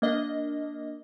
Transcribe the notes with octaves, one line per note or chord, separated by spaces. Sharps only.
A#3 D4 D#5